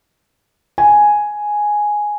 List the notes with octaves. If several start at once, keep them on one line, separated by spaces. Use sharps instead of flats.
G#5